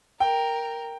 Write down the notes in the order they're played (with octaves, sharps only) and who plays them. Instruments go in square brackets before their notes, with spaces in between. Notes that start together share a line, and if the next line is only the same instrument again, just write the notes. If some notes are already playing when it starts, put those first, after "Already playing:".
[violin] A#4 [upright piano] G5